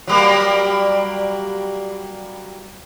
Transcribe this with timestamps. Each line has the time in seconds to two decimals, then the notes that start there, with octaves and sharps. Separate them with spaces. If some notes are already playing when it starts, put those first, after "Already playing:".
0.07 F#3 G3 A#3